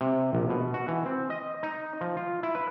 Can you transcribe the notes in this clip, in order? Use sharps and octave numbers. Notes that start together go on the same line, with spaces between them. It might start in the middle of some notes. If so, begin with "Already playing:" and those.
C3
A#1
B2
F#4
E3
C4
D#5
D#4
F3
F4
E4
B4